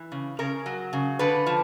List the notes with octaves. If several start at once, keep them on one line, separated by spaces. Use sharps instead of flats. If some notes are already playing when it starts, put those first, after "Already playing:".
Already playing: E3
C#3
C#3 A#4
F#3
C#3
D3 B4
F3